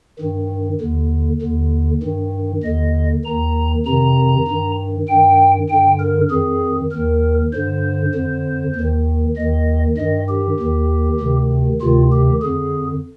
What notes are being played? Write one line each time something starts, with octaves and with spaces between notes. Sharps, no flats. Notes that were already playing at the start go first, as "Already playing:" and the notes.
G2 D#3
D#2 D3
D#2 D3
G2 D#3
D#2 D3 D#5
D#2 D#3 A#5
F2 C3 D#3 A#5
G2 D#3
G2 D#3 G5
G2 D3 G5
A#4
F2 D#3 G#4
D#2 D#3 A#4
G2 D3 C5
F2 D3
D#2 D#3
D#2 D#3 D#5
G2 D#3 D#5
G4
D#2 D#3
D2 C3 D#3
D2 C3 D#3 F4
G4
F2 D3 G#4